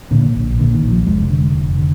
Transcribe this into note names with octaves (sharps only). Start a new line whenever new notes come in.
A#2 D3
A#1
A#2 D3
D#3
A#1
F3
F1 G#3
D3
F1
D3